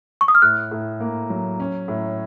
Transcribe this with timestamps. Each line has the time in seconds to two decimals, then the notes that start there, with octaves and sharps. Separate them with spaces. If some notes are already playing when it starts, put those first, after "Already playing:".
0.21 C#6
0.28 D#6
0.35 F6
0.42 A2 F#6
0.71 A2
1.00 A#3
1.30 F#3
1.60 C#4
1.88 A2